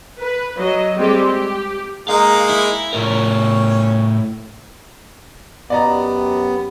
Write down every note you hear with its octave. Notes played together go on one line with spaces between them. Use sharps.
B4
F#3 D#5
G3 G#3 C4 G4
G4
G#3 A#3 D#4 F5
E4
A2 C#4 A#4
F#2 B3 G4 D5 D#5 A#5